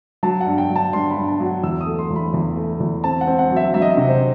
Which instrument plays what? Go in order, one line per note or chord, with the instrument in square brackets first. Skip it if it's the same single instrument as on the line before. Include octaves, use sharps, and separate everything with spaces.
[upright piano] F#3 A5
F#5
G2
G5
F#3
A5
G2 C6
B5
G2
A5
F#3
F#5
E2 E6
D#6
A3
C6
E2
B5
E2
A3
E2
C4 A5
F#5
C4
F#5
F#3
E5
F#3 E5
D#5
E5
C3
C5